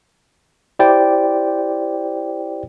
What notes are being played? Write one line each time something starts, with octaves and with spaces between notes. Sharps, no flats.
E4 G4 C5 D5 G5